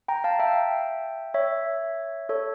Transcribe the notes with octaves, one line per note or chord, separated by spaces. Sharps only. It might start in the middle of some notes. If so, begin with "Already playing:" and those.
G5 A#5
F5 A5
E5 G5
C#5 E5
A4 C#5